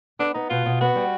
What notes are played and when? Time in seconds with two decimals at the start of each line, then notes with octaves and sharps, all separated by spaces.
0.19 B3 D4
0.34 B3 D#4
0.50 B2 F4
0.66 B2
0.81 B3 F#4
0.96 G3